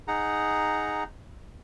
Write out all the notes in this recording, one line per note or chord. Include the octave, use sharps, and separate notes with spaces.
D#4 G#4 F#5 A#5